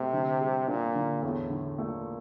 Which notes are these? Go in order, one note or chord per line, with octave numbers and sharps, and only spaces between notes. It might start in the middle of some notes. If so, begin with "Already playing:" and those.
Already playing: C3 A3
D3
G3
A#2 D4
D3
E2 A2
D3
A#2 A3